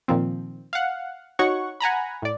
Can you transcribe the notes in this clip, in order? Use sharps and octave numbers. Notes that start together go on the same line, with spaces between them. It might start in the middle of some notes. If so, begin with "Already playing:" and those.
A#2 D#3 F3 C4
F5 F#5
D#4 F#4 C#5 F#5 C#6
F#5 G#5 A#5 B5
A2 D5